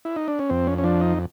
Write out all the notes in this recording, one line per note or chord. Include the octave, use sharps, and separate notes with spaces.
E4
D#4
D4
C#4
F2 C4
C#4
C#4
F3 D4
D#4